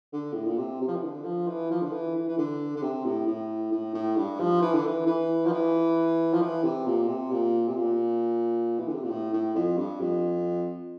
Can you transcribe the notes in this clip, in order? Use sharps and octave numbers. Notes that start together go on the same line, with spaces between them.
D3
A2
A#2
C3
C3
F3
E3
D3
F3
E3
F3
D3
E3
E3
E3
D3
D3
C3
A2
A2
A2
A2
G2
F3
E3
D3
E3
E3
F3
E3
F3
E3
C3
A#2
C3
A#2
C3
A#2
E3
D3
C3
A#2
A2
A2
F2
G2
F2